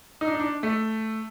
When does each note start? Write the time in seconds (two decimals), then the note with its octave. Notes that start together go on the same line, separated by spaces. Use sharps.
0.21 D#4
0.27 D4
0.35 D#4
0.40 D4
0.63 A3